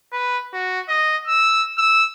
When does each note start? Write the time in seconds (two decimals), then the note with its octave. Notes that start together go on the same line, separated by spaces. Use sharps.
0.12 B4
0.54 F#4
0.89 D#5
1.27 E6
1.78 E6